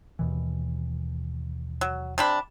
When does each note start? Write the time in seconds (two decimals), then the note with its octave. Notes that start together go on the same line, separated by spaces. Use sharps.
0.19 D#2 B2 E3
1.81 F#3
2.18 C3 D4 B5